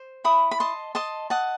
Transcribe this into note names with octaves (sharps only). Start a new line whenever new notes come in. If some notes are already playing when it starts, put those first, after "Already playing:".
Already playing: C5
E4 B5 D#6
B5
D#5 A5 C6
D#5 A5 C6
D#5 F#5 A5